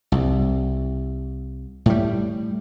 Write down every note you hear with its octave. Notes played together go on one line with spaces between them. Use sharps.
C2
A2 G3